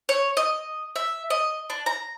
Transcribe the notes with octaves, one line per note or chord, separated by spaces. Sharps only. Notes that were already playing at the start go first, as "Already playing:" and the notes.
C#5
D#5
E5
D#5
D4
A#5